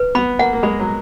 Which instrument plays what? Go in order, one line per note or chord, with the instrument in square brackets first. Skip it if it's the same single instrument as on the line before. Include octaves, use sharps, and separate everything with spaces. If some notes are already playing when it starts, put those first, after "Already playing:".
Already playing: [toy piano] B4
[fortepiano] B3 [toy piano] B5
[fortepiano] A#3 [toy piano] F#5
[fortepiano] A#3
[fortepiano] G#3 [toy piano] B5
[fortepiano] F#3